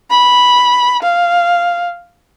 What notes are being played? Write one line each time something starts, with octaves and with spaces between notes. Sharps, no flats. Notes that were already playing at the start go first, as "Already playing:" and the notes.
B5
F5